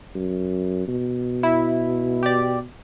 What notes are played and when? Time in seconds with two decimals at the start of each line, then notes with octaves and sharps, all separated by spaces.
0.16 F#2
0.88 B2
1.43 E4
2.23 G4 D5